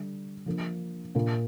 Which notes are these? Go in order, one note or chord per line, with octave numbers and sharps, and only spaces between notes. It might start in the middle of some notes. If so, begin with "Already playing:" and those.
Already playing: D3 G3
F3 A#3 D4
A#2 A#3 D4 F4